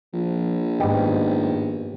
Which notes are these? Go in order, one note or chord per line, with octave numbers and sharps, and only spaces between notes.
A#1 F3
G#2 B2 D#3 B3 G4 D#5